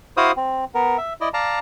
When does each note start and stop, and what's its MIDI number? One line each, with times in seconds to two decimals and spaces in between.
0.17 0.32 64
0.17 0.32 66
0.17 0.32 72
0.17 0.32 77
0.17 0.32 87
0.37 0.65 60
0.74 0.97 59
0.74 0.97 70
0.98 1.13 76
1.21 1.29 64
1.21 1.29 74
1.21 1.29 75
1.34 1.59 74
1.34 1.59 77
1.34 1.59 81
1.34 1.59 82